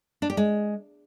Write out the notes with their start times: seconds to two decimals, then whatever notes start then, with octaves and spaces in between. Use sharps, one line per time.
0.22 D4
0.30 G4
0.37 G#3